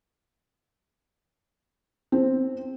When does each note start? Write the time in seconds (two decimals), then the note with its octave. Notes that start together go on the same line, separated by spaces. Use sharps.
2.12 C4